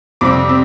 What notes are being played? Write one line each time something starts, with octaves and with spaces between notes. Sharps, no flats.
F2 C3 G3 C4 D6
C4